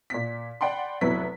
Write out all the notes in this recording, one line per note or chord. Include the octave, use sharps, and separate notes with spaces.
A#2 B6
D5 F#5 G5 B5 C6
F1 F#3 B3 E4 C#6 B6